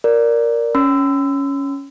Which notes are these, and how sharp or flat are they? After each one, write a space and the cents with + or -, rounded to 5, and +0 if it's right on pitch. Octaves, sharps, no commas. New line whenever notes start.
A#4 +0 D5 -5
C#4 +5 C6 -45 E6 +5